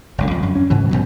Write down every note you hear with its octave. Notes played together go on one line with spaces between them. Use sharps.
F#1 C#2 D3
F2
F#2
C#4
G#2 C#3 E3
A#1 F#2 B2 F#3